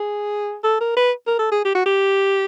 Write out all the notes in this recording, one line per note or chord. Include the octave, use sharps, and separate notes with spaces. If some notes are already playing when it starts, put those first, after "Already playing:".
Already playing: G#4
A4
A#4
B4
A#4
A4
G#4
G4
F#4
G4